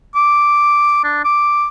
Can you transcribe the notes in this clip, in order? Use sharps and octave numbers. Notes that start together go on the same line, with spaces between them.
D6
D4
D6